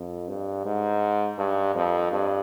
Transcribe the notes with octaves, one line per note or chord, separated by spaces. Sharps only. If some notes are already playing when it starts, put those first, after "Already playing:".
Already playing: F2
G2
G#2
G2
F2
G2